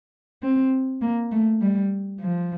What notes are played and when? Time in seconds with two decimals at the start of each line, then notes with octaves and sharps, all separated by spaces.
0.43 C4
1.02 A#3
1.32 A3
1.62 G3
2.20 F3